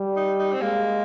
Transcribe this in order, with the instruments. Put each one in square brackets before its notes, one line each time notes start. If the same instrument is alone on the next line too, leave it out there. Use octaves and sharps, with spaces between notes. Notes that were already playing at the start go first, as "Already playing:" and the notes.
Already playing: [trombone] G3
[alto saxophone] D#4
D#4
C4
[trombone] G#3 [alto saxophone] A#3